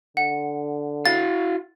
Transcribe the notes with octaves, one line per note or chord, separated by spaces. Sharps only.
D3 F#5
E4 F#4 F5 A6